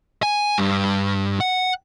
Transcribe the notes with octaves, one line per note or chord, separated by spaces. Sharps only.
G#5
G2
F#5